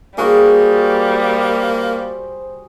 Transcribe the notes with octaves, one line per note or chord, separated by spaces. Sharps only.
G3 A#3 F#4 G#4 C5